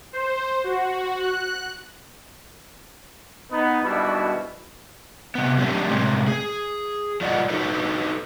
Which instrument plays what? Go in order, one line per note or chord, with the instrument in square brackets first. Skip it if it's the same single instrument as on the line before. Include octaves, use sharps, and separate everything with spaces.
[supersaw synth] C5
F#4
F#6
[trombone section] B3 D#4
G#1 B2 G3 D4 E4 F#4
[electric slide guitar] C3 B3
F#3 A3 A#3 C4 D4 G4
A2 C3 G#3
G#4
F#3 F4 D5 D#5 F#5
D#4 F#4 A4 B4